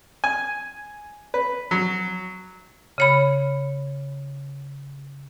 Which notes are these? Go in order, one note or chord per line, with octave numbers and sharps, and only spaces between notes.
G#5
B4
F#3
C#3 C#5 B5